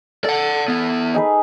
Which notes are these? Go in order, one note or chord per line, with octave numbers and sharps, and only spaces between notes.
A4 D5 F#5
E3 B3
D#4 G#4 B4